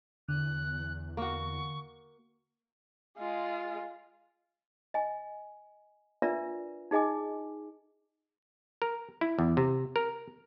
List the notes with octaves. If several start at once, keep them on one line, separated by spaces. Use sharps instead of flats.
E2 D3 F#6
A#3 F#4 C#6
G#3 F4
D#5 G#5
D4 F4 A#4 B4 D5 E5
D#4 G#4 D#5 G#5 D6
A#4
E4
E2
C3
A#4